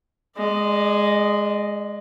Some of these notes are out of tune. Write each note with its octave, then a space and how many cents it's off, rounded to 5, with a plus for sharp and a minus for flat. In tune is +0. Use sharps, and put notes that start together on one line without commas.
G#3 +0 D5 +35